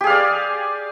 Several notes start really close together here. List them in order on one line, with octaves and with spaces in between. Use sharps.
G4 G#4 F5 D5